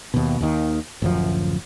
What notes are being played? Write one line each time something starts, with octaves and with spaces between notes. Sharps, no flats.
D#2 B2
D#2 D#3
D1 F#2 F3